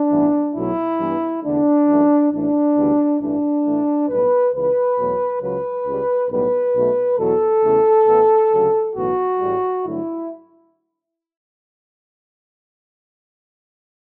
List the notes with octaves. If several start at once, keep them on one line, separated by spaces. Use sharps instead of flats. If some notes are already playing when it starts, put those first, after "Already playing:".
Already playing: D4
A1 G2 E3 B3
B1 B2 F#3 A3 E4
G2 E3 G3 B3
E2 D3 A3 D4
F#2 E3 A3
A1 A2 E3 A3 D4
D2 C#3 E3 G3 B3
A1 G2 E3 A3 D4
A2 E3 A3
B1 A2 G3 B3 B4
C#2 C#3 E3 B4
E2 B2 F#3 A3
C#2 C#3 F#3 B4
C#2 C#3 G3
B1 A2 G3 B3 B4
B1 B2 A3
E2 B2 F#3 A4
E2 C#3 E3 A3
A1 A2 E3 B3
D2 C#3 F#3
B1 A2 E3 B3 F#4
A1 A2 G3
G2 D3 F#3 A3 E4